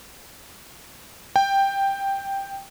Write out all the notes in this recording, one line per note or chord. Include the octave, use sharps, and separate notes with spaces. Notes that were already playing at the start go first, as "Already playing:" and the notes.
G5